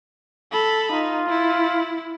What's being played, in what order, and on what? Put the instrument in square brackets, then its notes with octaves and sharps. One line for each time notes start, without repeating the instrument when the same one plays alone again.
[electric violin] A4 B5
[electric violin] D#4 [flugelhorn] F4
[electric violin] E4